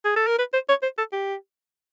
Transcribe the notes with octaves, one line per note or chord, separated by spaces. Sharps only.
G#4
A4
A#4
B4
C5
C#5
C5
A4
G4